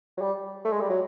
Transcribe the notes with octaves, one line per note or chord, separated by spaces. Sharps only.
F#3
G3
A3
G#3
G3
F#3